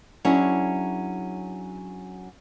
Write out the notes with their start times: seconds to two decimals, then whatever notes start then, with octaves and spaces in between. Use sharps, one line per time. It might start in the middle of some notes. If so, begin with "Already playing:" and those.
0.25 F#3 C#4 D4 E4 G#4